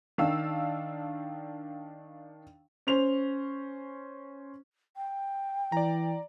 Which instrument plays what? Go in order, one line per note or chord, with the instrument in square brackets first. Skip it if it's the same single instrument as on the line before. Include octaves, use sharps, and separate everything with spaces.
[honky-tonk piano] D#3 D4 F5 E6
[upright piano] C#4 C5 F7
[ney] G5
[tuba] E3 [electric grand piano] D5 A#5